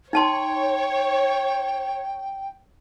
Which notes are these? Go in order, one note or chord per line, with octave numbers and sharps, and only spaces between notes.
D#4 C#5 G5 A5 C6